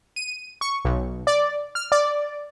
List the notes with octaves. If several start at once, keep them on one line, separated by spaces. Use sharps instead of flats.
D#7
C#6
B1
D5
F6
D5